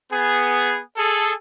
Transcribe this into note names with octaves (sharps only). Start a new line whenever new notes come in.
B3 G#4
G#4 A4